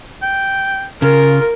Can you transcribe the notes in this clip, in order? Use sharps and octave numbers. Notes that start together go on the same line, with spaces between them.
G5
C#3 F4 A#4